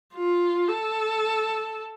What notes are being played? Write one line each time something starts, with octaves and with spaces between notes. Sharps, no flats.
F4
A4